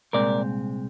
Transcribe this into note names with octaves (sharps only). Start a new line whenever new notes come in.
C2 A#2 G#3 C4 A#4 D5